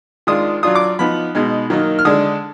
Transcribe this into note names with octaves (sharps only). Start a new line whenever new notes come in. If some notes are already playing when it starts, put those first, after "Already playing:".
D#3 G#3 D4 F4 D#6
F#3 D4 F4 D#6
D6
F3 B3 D#4 B5
B2 G#3 D#4
D#3 F#3 A#3 D#4
F6
D3 G#3 D4 D#6